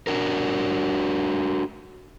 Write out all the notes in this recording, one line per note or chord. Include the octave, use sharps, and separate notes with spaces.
D4 F#4 A#4